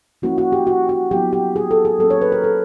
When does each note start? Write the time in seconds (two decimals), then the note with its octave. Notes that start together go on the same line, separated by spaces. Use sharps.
0.22 F3 A#3 C#4 E4 F#4
0.38 F#4
0.52 G4
0.67 F#4
0.89 F#4
1.11 F#3 B3 E4 G4
1.33 G4
1.56 G#4
1.71 A4
1.85 G#4
1.99 F#3 A#3 C#4 A4
2.10 C#5
2.22 B4
2.32 A#4
2.44 A4